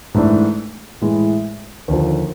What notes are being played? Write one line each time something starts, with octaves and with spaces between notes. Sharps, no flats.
G#2 E3 A3 D4
A2 E3 G#3
D#2 D3 F3